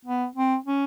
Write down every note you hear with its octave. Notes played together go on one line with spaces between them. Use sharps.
B3
C4
C#4